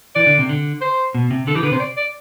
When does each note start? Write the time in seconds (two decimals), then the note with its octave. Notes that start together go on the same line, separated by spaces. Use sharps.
0.16 E3 D5
0.27 D3
0.39 C3
0.49 D3
0.81 C5
1.15 B2
1.31 C3
1.47 D3 A4
1.55 E3 G4
1.63 D3 B4
1.72 C3 C5
1.80 D5
1.97 D5